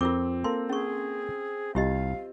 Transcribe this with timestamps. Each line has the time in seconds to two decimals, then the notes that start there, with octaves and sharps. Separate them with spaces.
0.01 F2 C4 F4 A#4 D6
0.44 A#3 A4 A#5 C6
0.69 C#4 G#4 C#6
1.75 C2 F4 G4 D#5 F5